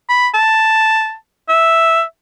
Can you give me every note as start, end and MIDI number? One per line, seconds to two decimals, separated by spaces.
0.09 0.28 83
0.34 1.15 81
1.49 2.02 76